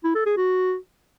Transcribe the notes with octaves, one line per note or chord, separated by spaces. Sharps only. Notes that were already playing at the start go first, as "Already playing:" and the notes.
E4
A4
G#4
F#4